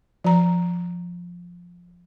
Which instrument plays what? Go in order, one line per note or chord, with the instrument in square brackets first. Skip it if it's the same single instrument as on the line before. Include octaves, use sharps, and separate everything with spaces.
[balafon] F3 A#5